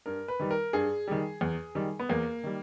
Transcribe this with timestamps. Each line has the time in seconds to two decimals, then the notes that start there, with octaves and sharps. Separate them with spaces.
0.06 G2 A#4
0.28 B4
0.40 D#3 G3
0.51 A#4
0.73 G2 G#4
1.08 D#3 G3
1.41 E2
1.75 D#3 G3
1.99 B3
2.09 E2 A#3
2.44 D#3 G3